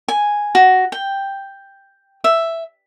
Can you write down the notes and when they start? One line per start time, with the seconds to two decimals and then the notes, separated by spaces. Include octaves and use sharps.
0.08 G#5
0.55 F#4
0.92 G5
2.24 E5